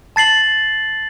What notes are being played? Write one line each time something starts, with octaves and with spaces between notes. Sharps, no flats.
A5 A6 C7 F#7